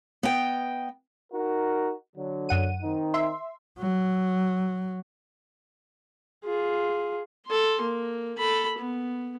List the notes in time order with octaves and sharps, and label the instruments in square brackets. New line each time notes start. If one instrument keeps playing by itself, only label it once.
[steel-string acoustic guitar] B3 D#5 G5
[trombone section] D#4 F#4 A#4
D3 F#3
[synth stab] F#2 F#5 D#7
[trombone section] D#3 C4 D#4
[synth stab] E5 C6
[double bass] F#3
[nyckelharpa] F4 G#4
A4 C6
A#3
A4 B5
B3